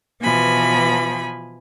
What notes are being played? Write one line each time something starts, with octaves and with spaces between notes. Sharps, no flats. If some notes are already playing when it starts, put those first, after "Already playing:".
B2 E3 F3 G#5 B5